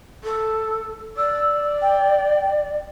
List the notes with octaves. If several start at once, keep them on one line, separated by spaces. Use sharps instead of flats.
A4
D5 E6
G5